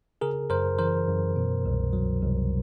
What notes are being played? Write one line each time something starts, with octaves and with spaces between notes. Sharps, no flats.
C#3 G#4 A#4
F#2 A#4 C5
E3 A#4 C5
F#2
B2
C2
F#3
C2